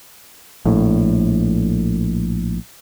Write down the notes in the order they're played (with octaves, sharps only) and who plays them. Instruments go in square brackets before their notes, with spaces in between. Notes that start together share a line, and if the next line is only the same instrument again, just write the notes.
[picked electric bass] A#1 A2